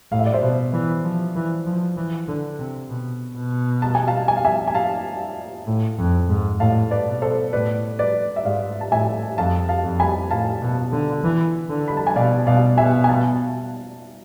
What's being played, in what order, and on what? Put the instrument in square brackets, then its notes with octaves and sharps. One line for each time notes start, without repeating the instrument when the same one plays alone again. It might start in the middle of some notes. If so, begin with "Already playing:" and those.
[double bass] A2 [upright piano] F5
[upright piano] E5
D5
C5 E5
[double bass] B2
E3
F3
E3
F3
E3
D3
C3
B2
B2
[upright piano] A5
G#5
F5 A5
G#5
F5
E5 G#5
G#5
F5 A5
[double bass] A2
F2
G#2
[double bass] A2 [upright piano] F5 A5
[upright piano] B4 D5
[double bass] B2
[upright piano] A4 C5
[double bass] A2 [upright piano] B4 D5
[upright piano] B4 D5
E5
[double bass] G#2 [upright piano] D5 F5
[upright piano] A5
[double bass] A2 [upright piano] E5 G#5
[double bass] F2 [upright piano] F5 A5
[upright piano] F5 A5
[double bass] F2
[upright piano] G#5 B5
[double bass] A2 [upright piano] F5 A5
[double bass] B2
D3
E3
D3
[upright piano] B5
A5
G#5
[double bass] B2 [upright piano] D5 F5
[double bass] B2 [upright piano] D5 F5
[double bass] B2 [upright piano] E5 G#5
[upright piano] G#5
F5 A5